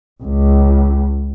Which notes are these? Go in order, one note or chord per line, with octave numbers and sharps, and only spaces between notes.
C#2